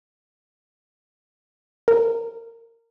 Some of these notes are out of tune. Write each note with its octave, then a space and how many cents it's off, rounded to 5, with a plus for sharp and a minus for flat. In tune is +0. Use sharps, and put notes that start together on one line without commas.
A#4 -20